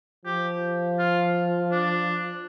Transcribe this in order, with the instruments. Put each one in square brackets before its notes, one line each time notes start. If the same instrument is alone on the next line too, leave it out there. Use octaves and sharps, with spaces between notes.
[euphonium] F3 [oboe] G4
[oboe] F4
D4